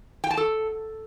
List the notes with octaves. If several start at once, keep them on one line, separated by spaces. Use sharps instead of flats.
G5
A5
A4